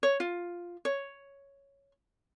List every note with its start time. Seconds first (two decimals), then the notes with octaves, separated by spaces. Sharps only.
0.03 C#5
0.20 F4
0.85 C#5